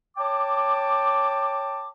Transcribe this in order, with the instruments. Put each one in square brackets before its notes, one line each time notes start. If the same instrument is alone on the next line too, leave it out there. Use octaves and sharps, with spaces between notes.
[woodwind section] C#5 G5 A5 D6